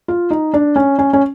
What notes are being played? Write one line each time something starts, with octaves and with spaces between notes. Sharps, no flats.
F4
D#4
D4
C#4
C#4
C#4